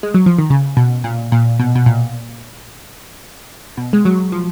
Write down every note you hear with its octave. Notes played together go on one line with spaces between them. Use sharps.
G#3
F#3
F3
D#3
C#3
B2
A#2
A#2
B2
B2
A#2
B2
G#3
F#3
F3